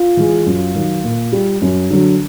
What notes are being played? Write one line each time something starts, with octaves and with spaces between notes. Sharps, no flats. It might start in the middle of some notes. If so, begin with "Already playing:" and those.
Already playing: F4
E3 G#3
F#2
D#3 F#3
A#2
G3
F#2
D3 F#3